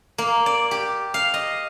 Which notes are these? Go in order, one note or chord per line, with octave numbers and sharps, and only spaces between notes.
A#3
D5
G4
F5
D#5